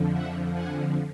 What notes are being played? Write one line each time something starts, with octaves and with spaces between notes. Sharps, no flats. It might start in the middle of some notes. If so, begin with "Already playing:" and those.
Already playing: F2 D3 F3
E5 F#5
F#5 G#5